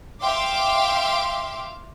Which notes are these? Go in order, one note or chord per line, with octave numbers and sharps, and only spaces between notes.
E5 F5 G5 C6 D6